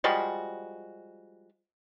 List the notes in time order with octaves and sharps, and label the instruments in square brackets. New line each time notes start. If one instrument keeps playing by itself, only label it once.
[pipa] F3 G3 G#3 F#4